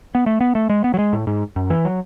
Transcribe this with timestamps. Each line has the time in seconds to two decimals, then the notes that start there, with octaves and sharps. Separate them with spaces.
0.15 B3
0.26 A3
0.41 B3
0.55 A3
0.70 G#3
0.84 B3
0.94 F#3
0.99 G#3
1.13 A2
1.27 G#2
1.56 F#2
1.70 E3
1.85 F#3